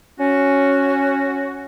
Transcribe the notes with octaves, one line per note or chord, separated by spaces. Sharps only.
C#4 F#4